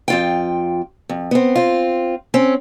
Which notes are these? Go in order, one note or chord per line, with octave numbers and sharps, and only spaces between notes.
F2 F4 G5
F2
B3 C4
C4 F4
C4 C#4